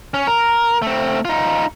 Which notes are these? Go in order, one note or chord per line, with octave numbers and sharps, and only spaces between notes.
C#4
A#4
A3 C4
D#4 F4